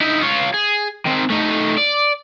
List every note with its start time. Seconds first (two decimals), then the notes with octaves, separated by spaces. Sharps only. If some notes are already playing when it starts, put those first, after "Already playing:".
0.01 D#4 E4
0.21 F4 C#5
0.54 G#4
1.06 D#3 C4
1.30 A3 D#4
1.78 D5